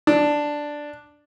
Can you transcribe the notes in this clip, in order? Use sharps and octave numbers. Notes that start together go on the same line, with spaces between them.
D4